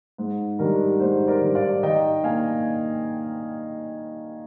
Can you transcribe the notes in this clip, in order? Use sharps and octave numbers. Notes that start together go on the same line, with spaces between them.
G#2
D#3 G3 D4 A#4
G#2 C5
A#4 D5
D#3 G3 D4
D5 F5
D#3 D#5 G5
A#3 D4 F5 G#5